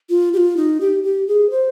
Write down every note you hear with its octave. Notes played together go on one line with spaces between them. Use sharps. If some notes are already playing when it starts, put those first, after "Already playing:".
F4
G4
F4
D#4
G4
G4
G#4
C5